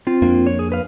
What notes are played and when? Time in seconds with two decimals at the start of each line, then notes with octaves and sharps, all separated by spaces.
0.07 C4 F4
0.22 F2 A#3 D4
0.47 C#5
0.59 G#4
0.72 B4 F5